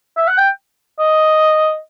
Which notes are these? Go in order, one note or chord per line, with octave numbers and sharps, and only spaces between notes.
E5
F#5
G5
D#5